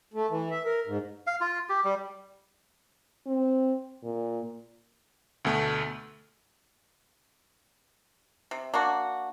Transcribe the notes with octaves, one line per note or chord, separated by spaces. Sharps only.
A3
E3
E5
A#4
G#2
F5
F4
G4
G3
C4
A#2
D2 B2 A3
C3
A#3 D4 F#4